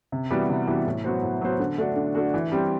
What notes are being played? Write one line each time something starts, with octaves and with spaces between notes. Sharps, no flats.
C3
E3 G3 B3 F#4
C3
E3 G3 B3 F#4
A2
F#3 B3 F#4 C5
A2
F#3 B3 F#4 C5
D3
A3 D4 F#4
D3
A3 D4 F#4
E3
G3 C4 G4